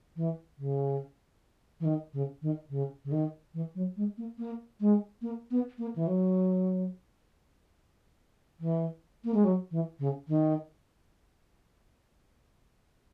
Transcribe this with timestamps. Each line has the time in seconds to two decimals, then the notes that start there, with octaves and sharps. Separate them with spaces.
0.16 E3
0.58 C#3
1.80 E3
1.85 D#3
2.13 C#3
2.42 D#3
2.70 C#3
3.05 C#3
3.12 D#3
3.54 E3
3.75 F#3
3.97 G#3
4.18 A#3
4.38 A#3
4.80 G#3
5.22 A#3
5.51 B3
5.78 A#3
5.96 E3
6.07 F#3
8.60 E3
9.24 A#3
9.34 G#3
9.44 F#3
9.71 E3
9.99 C#3
10.28 D#3